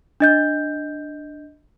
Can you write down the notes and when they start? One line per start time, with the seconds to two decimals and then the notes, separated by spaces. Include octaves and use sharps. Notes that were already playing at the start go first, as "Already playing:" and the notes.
0.20 D4 D#5 G6